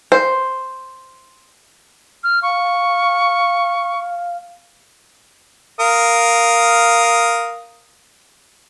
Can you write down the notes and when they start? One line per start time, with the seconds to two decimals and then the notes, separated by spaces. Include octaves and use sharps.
0.12 C5
2.24 F6
2.43 F5 C#6
5.80 A#4 F5 D#6